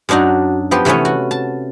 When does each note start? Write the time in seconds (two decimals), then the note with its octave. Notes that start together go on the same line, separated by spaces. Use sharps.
0.09 F#2 F#3 D4 D#4 F#4
0.71 F3 B3 G4 C6
0.85 C3 E3 A3 B3 C#4
1.05 F#4
1.31 A5